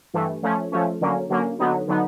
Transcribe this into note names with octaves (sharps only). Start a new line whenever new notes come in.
G2 E3 A3
F3 A3 C#4
F3 A3 C#4
D3 F#3 A#3 C#4
D3 F#3 A#3 C#4
D3 F#3 B3 D#4
D3 F#3 B3 D#4